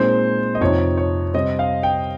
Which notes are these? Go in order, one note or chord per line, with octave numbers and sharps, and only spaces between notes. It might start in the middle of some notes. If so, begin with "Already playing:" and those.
Already playing: A#2 G#3 C4 D#4 C5
D#5
F2 C3 F3 C4 D#4 C#5
C#5
C3 G3 C4 D#5
F5
G5